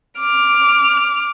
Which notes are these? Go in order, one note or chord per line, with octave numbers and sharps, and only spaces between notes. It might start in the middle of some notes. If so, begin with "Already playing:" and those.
D6 F6